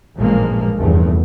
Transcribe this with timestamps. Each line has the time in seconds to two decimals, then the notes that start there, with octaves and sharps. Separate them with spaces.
0.17 A1 G2 A#2 F3 G#3 A#3
0.77 F1 E2 G2 A3